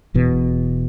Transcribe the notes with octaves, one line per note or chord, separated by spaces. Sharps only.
E1 E2 B2